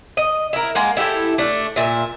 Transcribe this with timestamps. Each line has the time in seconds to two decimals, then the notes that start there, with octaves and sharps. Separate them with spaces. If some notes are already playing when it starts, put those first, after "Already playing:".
0.17 D#5
0.53 E4 A#4
0.75 G#3 A#3 F#5
0.97 E4 G4 A4
1.38 A3 D4
1.76 A#2 E5